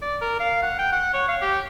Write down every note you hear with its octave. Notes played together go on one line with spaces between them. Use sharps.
D5
A#4
F5
F#5
G5
F#5
C#5
F5
G4